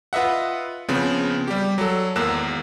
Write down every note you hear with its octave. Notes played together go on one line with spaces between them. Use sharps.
F4 B4 D#5 E5 F#5
C#3 F3 B3 C4
G3 G4
F#3 A4
G#1 E2 A#3 E6 F#6 E7